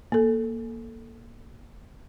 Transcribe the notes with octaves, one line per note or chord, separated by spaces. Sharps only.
A#3 A4